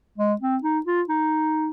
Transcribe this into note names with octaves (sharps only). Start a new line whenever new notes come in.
G#3
C4
D#4
F4
D#4